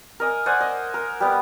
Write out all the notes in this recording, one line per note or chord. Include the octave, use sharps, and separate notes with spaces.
A#4 D#5 G#5
C5 D5 F#5 G#5
D#5
A#4
G3 B3